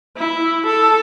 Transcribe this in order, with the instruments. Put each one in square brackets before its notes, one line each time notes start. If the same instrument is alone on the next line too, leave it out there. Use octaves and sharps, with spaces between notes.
[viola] E4
A4